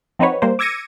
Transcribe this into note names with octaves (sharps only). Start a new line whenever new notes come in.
F3 C4 D#4 F#4 B4 C#5
G3 A#3 C5
D6 E6 G#6 A#6 C#7 D#7